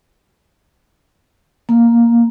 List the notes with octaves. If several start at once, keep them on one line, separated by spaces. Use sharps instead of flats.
A#3